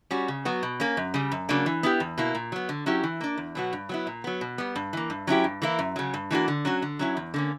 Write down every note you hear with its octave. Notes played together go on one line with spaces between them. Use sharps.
G3 C#4 F#4
C#3
F#3 B3 F#4
B2
A#3 C#4
F#2
C#3 G3
F#2
C#3 F#3 A#3 D4
E3
B3 E4 G4
E2
B2 A#3 E4
A#2
F#3 B3
D3
F#3 C#4 E4 G4
E3
A#3 D4
E2
B2 F#3 B3 F#4
G2
F#3 B3 E4
A#2
F#3 B3
B2
G3 B3
G2
E3 A#3
G2
F#3 C#4 E4 G4
G2
E3 A#3 E4
F#2
C#3 F#3
G2
E3 A#3 D4 F#4
D3
F#3 C#4 F#4
D3
F#3 C#4 E4
E2
D3 A#3 C#4